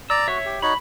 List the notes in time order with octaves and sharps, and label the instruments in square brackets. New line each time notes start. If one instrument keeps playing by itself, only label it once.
[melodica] D5 A#5 [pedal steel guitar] E6
[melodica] F#4 [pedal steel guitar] C#5 E5
[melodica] G4
[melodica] D#4 F#4 C#5 [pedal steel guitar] B5